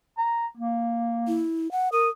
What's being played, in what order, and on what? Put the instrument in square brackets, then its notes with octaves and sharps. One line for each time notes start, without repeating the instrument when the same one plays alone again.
[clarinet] A#5
A#3
[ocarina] E4
F#5
[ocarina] A#4 [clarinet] D#6